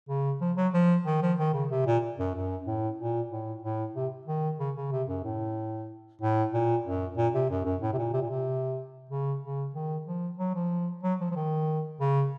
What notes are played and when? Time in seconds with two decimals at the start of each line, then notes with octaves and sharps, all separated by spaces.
0.09 C#3
0.41 F3
0.57 F#3
0.73 F3
1.06 D#3
1.22 F3
1.38 D#3
1.54 C#3
1.71 C3
1.86 A#2
2.19 F#2
2.35 F#2
2.67 A2
2.99 A#2
3.31 A2
3.63 A2
3.96 C3
4.27 D#3
4.59 C#3
4.76 C#3
4.92 C3
5.08 F#2
5.24 A2
6.21 A2
6.54 A#2
6.85 F#2
7.17 A#2
7.34 C3
7.50 F#2
7.65 F#2
7.82 A2
7.93 C3
7.98 A#2
8.13 C3
8.22 A#2
8.30 C3
9.11 C#3
9.42 C#3
9.74 D#3
10.07 F3
10.39 F#3
10.55 F3
11.03 F#3
11.20 F3
11.31 F3
11.36 D#3
12.00 C#3